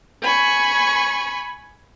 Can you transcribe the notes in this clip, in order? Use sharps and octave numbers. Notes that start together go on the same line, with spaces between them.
G#5 B5 C#6